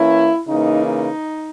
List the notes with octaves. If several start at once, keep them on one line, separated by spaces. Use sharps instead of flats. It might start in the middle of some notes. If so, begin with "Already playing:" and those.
Already playing: E3 A#3 C#4 E4
C#3 E3 A#3 D#4
D#4